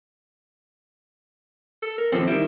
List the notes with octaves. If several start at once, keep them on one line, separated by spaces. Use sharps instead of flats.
A4
A#4
D#2 F3 C4 A4
D#3 G3 E4